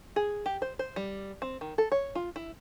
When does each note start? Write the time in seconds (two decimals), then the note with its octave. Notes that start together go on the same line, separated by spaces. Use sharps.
0.16 G#4
0.46 G4
0.62 C5
0.79 C5
0.96 G3
1.42 C4
1.61 D#3
1.78 A4
1.92 C#5
2.15 F4
2.36 E4